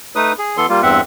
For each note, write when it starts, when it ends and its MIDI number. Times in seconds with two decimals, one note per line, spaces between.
0.16 0.33 57
0.16 0.33 63
0.16 0.33 71
0.16 0.33 87
0.38 0.57 68
0.57 0.66 52
0.57 0.66 59
0.57 0.66 69
0.57 0.66 84
0.69 0.81 55
0.69 0.81 58
0.69 0.81 65
0.83 1.01 40
0.83 1.01 43
0.83 1.01 60
0.83 1.01 76
0.83 1.01 78